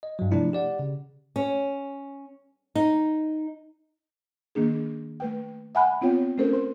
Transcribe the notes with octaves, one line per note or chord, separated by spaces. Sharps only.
D#5
G2 F#3
C3 F3 A3 D4 E4
G4 D5 F#5
C#3
C#4
D#4
D#3 A#3 D4 G#4
A3 B4 G5
E5 F#5 G#5 B5 F#6
B3 C4 F4 C#5 G5
A3 C4 C#4 A4 A#4 C5
C5 C6